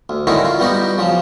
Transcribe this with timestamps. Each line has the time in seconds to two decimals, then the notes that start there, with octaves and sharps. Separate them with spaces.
0.09 D2
0.27 D3 D#3 C#4 D#4 E4 F#4
0.45 F4
0.59 G3 B3 D#4 F#4 G4
0.98 C#3 F3 F#3